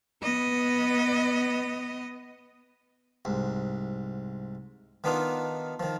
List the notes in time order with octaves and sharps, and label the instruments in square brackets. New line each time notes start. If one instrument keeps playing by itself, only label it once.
[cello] B3 D#5
[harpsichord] C2 G#2
D#3 B3 D4 D#4 F4
D#3 F3